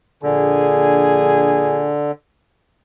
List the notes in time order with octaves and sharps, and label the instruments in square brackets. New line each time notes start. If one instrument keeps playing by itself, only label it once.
[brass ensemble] A#1 G#4 [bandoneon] D3